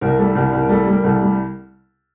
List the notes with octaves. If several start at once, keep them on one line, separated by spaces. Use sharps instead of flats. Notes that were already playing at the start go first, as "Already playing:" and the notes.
C2 A#4
G3 A4
C2 A#4
C2
A#4
G3 A4
G3
A#4
C2 A4
G3